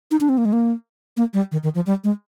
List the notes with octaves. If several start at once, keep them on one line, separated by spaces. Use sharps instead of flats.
D#4
D4
C4
A#3
G#3
A#3
A#3
G3
D#3
D#3
F3
G3
G#3